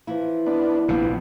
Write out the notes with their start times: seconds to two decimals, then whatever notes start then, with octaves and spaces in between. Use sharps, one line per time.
0.07 E3 F3 E4
0.46 B3 D4
0.88 A#1 C3 B3